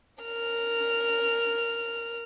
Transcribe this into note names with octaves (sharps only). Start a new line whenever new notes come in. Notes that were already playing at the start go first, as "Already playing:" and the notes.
A#4 F6